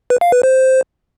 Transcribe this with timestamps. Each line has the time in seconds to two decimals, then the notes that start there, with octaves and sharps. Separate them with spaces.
0.10 B4
0.21 F5
0.32 B4
0.43 C5